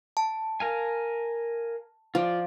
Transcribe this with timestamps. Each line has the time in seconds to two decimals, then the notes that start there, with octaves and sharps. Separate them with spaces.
0.17 A5
0.60 A#4 F5 G#5
2.15 F3 F4 D5